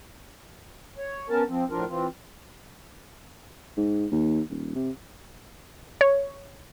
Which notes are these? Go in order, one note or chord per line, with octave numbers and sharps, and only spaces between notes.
C#5
B3 C#4 A#4 A5
F3 C4
A2 F3 D4 F4 A#4
E3 C4 F4
G#2
D#2
D#1
C3
C#5